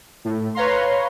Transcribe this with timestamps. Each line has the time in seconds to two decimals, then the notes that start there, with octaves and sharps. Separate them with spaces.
0.24 A2
0.55 B4 C#5 F5 A#5 C6